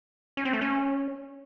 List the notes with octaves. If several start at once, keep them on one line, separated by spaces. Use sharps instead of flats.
C#4
C4
A3
C#4